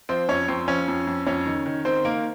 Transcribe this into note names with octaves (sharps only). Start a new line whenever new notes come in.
F3 C4 C5
F2 C#4 C#5
F2 C4 C5
F3 C#4 C#5
F2
F2
F2 C#4 C#5
D#3
D#3
D#3 C4 C5
D#3 A#3 A#4